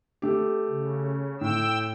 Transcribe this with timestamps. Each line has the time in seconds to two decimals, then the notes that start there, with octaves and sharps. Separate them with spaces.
0.22 A3 G4
0.68 C#3
1.41 A2 G5 E6